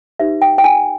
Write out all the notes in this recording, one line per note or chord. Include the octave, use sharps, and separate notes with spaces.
D#4 G4 B4 E5
G5
G5
G#5